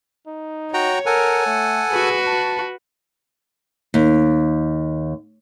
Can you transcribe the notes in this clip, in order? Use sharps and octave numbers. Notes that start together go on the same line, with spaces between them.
D#4
F#4 C#5 G5 A#5
A4 A#4 F#5 G#5
A3
F#4 G#4 B4
A5
D#2